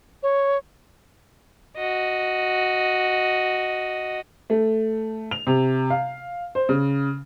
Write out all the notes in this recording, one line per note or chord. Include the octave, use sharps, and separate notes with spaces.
C#5
F#4 D#5
A3
F7
C3
F5
C5
C#3